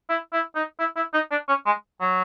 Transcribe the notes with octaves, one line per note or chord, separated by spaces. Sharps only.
E4
E4
D#4
E4
E4
D#4
D4
C#4
G#3
F#3